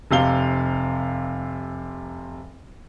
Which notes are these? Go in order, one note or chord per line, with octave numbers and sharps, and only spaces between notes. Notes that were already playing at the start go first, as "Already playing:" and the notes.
F1 C3 F5 G7